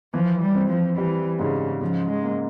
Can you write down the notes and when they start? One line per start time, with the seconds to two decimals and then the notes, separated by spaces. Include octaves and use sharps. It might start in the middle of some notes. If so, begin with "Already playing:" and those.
0.14 E3 F3
0.41 G3
0.55 C4
0.70 F3
0.97 E3 G3
1.39 G#2 C#3
1.81 C#3 F3
2.09 G#3
2.23 A#3